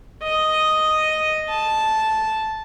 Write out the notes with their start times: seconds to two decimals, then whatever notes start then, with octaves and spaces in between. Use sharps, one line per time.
0.22 D#5
1.49 A5